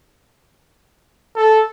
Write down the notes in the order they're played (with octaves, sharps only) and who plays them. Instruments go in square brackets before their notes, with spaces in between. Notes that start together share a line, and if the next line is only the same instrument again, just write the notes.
[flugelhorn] A4